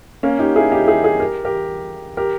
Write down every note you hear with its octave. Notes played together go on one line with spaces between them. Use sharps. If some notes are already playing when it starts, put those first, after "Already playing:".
A#3 C#4
D#4 G4
E4 G#4
D#4 G4
E4 G#4
E4 G#4
G4 A#4
G4 A#4
G4 A#4